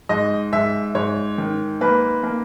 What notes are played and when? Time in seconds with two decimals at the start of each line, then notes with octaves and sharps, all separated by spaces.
0.09 G#2 D#5
0.52 G#2 E5
0.95 G#2 C#5
1.38 D#3
1.81 A#3 B4
2.23 A#3